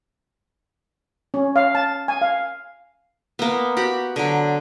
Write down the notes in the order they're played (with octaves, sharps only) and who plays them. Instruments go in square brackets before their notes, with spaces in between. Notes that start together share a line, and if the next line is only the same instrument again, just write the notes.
[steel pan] C#4
F5
A5
G#5
F5
[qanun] A#3 B3
F#4 G4 B5
D3 F#3